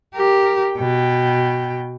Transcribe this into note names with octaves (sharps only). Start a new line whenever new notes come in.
G4 A#4
B2 G5